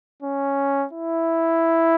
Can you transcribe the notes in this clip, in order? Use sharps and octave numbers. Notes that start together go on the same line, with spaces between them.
C#4
E4